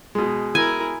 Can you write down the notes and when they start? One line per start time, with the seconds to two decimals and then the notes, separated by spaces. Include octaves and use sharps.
0.15 B2 G#3
0.55 E4 A#4 G#5